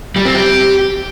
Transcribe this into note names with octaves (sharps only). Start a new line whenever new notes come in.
G3
C4
G4